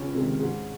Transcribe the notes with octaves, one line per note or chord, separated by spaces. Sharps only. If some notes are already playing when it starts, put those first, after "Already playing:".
Already playing: C#2 C#4
C3 D#3 G#3
G#2